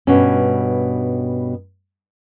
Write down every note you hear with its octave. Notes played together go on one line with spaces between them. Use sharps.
G2 B2 C#4